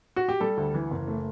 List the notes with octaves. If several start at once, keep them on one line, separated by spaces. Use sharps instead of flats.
F#4
G4
G3 A4
D2
E3
F#1
A3